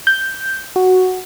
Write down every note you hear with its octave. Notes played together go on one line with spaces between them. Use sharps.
G6
F#4